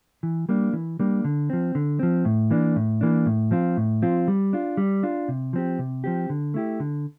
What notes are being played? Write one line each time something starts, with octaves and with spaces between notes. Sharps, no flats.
E3
G3 A#3 D4
E3
G3 A#3 D4
D3
F3 C4
D3
F3 C4
A2
E3 A#3 D4
A2
E3 A#3 D4
A2
F3 C4 F4
A2
F3 C4 F4
G3
D4 F4
G3
D4 F4
C3
F3 C4 G4
C3
F3 C4 G4
D3
A3 E4 G4
D3